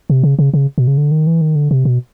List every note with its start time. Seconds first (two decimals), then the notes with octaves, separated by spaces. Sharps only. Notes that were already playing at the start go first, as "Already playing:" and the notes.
0.10 C3
0.23 C#3
0.39 C#3
0.54 C#3
0.78 B2
0.87 C#3
0.98 D3
1.11 D#3
1.27 E3
1.41 D#3
1.55 D3
1.71 C3
1.85 B2